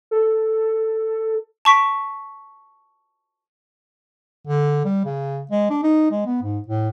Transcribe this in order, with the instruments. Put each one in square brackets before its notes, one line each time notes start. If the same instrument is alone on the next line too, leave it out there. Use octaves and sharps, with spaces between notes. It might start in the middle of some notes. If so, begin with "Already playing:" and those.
[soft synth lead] A4
[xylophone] A5 C#6 B6 D7
[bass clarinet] D3
G3
C#3
G#3
D4
D#4
G#3
B3
G#2
A2